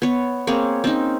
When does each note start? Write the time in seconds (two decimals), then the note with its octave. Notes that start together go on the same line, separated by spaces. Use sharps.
0.02 B3 C#5
0.47 A#3 C4 G#4 C#5
0.84 C4 C#4 D#4